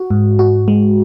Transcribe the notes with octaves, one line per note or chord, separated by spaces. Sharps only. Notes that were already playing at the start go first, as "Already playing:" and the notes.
Already playing: F#4
G#2
F#4
G#3